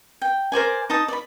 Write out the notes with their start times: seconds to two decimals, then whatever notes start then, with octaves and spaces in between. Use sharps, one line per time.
0.22 G5
0.52 A#4 C5 D5 G#5
0.90 D#4 A5 D#6
1.08 D5 B5